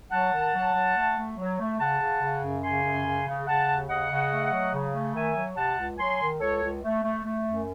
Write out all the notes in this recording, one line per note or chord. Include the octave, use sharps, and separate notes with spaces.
F#3 F#5 A5
D#3
F#3
F#3
A3
A3
F#3
A3
C#3 F#5 A5
C#3
C#3
F#2
C#3 G#5 C6
F#2
C#3
C#3
C#3 F#5 A5
D#2
C#3 D#5 F#5
C#3
A3
F#3
C#3
A3
D#3 E5 G#5
F#3
C3 F#5 A5
C#2
F#3 G#5 C6
D#3
C#2 A4 C#5
C#2
A3
A3
A3
F#2